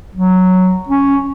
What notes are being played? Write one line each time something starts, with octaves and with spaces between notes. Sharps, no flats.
F#3
C#4